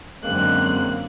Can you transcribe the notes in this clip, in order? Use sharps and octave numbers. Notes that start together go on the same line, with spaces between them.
F#2 D3 G#3 A#3 C4 F#6